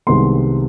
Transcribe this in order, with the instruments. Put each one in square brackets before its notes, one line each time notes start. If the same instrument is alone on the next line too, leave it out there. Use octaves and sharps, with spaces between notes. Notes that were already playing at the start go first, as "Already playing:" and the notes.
[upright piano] C2 C3 D#3 G#3 B3 C6